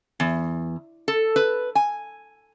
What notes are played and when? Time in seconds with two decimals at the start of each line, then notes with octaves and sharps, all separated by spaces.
0.20 E2
1.08 A4
1.36 B4
1.75 G#5